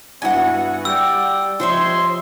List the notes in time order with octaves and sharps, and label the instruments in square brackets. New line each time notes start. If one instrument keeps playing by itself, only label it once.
[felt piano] G2 E4 G#6 [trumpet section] B3 F#4 E5 [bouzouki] F#5 G#5
[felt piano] G3 [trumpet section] D5 G5 [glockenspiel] E6
[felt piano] F3 G4 [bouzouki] C5 C#5 E5 [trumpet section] D#5 C6